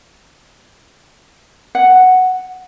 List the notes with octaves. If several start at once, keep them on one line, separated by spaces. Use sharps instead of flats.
F#5